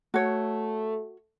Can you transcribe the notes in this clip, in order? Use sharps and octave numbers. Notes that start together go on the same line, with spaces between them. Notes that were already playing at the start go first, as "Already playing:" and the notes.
A3 F#4 C#5